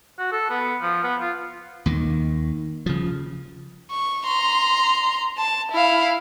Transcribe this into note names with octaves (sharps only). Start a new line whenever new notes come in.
F#4
A4
B3
F3
B3
F4
D#2 D#3
C#3 F3
C#6
A#5 C6
A5
E4 F5